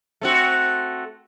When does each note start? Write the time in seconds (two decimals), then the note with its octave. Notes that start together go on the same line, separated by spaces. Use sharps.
0.21 A3 C4 F#4